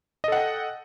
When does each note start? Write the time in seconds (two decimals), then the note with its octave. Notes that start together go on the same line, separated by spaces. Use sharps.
0.24 D#5
0.28 A4
0.32 F#5
0.37 G5